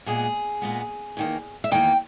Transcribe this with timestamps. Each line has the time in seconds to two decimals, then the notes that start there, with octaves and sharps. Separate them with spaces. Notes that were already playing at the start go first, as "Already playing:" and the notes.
0.06 A#2 G#3 B3 G#4
0.62 A#2 G#3 B3
1.17 E2 D#3 A#3
1.64 E5
1.72 E2 D#3 A#3 G5